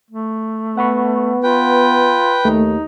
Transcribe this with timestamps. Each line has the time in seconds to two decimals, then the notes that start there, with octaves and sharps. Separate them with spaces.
0.11 A3
0.77 B3 F#5 B5 C#6
1.43 F4 B4 G5
2.45 D#2 A3 D#4